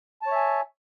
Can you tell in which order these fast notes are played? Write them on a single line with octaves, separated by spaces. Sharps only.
A5 C#5 E5 G#5